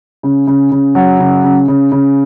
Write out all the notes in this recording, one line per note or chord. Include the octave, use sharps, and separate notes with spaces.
C#3
C#3
C#3
F#3
C#3
C#3
C#3
C#3